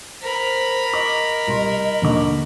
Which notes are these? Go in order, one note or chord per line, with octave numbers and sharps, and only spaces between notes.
A#4 C5 B5
D#5 D6
C2 C6
D#2 D3 D6